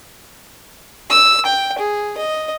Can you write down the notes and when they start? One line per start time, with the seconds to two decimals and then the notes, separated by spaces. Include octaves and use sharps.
1.10 E6
1.45 G5
1.78 G#4
2.17 D#5